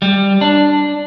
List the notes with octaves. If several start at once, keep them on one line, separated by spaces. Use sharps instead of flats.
G3
D4